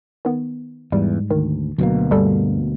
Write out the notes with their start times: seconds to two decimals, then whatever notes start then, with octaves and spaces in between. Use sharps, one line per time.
0.25 D#3 B3
0.92 E2 G#2 G3
1.31 D2 D#3
1.78 D2 B2 F#3 A#3
2.11 G2 G3 A4